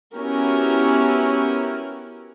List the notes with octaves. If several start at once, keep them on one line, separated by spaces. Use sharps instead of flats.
B3 C#4 E4 F#4 G4 A#4